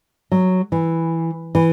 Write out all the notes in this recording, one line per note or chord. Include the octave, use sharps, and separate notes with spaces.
F#3
E3
E3